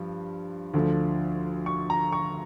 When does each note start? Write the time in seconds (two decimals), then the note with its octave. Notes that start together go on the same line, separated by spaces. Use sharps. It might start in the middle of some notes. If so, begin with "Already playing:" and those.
Already playing: G2 F3
0.74 D2 D3 F3
1.66 C#6
1.90 A#5
2.12 C#6